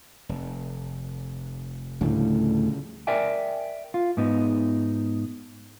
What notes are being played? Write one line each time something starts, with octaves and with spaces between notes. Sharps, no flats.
F1
D2 A2 C#3 F3 G3
A#4 D5 E5 G5 G#5
F4
G#2 B3 D#4